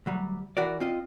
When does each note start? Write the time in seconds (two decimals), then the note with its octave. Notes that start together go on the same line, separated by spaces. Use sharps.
0.06 D2 F#3 G3
0.57 E3 F#4 A#4 D5
0.80 C4 F4 D#5